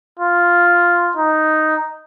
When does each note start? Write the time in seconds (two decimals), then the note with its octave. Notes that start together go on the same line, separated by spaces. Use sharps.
0.19 F4
1.17 D#4